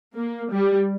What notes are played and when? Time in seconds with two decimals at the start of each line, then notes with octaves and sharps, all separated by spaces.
0.18 A#3
0.52 G3